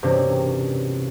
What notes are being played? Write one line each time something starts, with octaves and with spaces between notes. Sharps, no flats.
E1 G2 C3 A#3 C#4